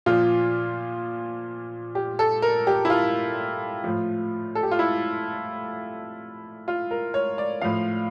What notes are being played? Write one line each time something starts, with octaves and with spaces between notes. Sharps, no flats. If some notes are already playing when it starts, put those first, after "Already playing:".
A#2 F3 F4
G4
A4
A#4
G4
E4
F4
A2 F3
A4
G4
F4
E4
F4
A#4
C#5
D5
A2 F3 F5